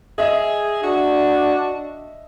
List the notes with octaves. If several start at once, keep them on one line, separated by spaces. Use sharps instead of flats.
G#4 D#5 E5
D4 F#4